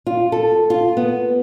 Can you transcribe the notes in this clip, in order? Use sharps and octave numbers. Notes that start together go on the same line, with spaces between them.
F4
A4
F4
B3